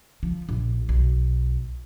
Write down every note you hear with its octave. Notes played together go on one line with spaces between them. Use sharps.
F3
A#1
B1